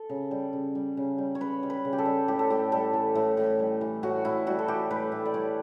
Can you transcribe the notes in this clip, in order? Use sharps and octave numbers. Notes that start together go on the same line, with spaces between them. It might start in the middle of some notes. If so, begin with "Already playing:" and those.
Already playing: A4
C#3
G3
C#3
G3
C#3
G3
C#5
C#3 B4
G3
B4
C#3
G4
A4
G3
A2 G4
A4
A2 G4
G3 A4
E3
A2
A2
G3
E3
A2 F#4
A2 E4
G3 F#4
A4
E3 G4
A2 B4
A2
D5
G3 C#5